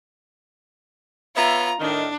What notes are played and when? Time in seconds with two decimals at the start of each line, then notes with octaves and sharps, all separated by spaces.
1.36 B3 F4 C#5 E5 A#5
1.80 A2 D#3 D4